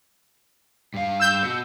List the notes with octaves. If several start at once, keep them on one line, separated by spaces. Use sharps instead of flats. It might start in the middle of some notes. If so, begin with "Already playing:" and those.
G2 F5
E6 G6
B3 F#4